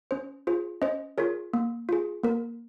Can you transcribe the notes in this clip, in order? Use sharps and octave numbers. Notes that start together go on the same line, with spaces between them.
C#4 C5
F4 G#4 C5
C#4 C5 D#5
F4 G#4 A#4 C#5
A#3
F4 G#4
A#3 A#4